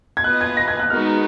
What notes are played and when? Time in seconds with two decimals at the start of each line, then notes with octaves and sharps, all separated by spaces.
0.17 G#6
0.24 B3 F4 B4 D#5 F#6
0.41 G#6
0.57 A#6
0.68 G#6
0.79 F#6
0.90 G#3 B3 D#4 F#4 A#4 F6